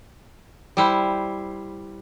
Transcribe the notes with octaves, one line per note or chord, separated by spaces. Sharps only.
G3 E4 C5